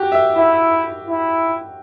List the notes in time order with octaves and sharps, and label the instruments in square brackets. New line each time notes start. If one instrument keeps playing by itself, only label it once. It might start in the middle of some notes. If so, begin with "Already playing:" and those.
Already playing: [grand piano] F#4 G4
E5
[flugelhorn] E4 [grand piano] E5
[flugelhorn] E4